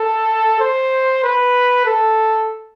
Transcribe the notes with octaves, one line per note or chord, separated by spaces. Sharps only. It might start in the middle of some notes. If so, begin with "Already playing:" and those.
Already playing: A4
C5
B4
A4